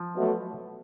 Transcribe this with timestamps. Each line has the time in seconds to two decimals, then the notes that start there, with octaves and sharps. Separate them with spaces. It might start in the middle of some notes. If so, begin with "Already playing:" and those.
Already playing: F3
0.14 B2 F#3 A3